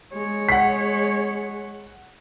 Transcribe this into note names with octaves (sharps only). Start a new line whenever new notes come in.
G#3 C#5
F#5 B6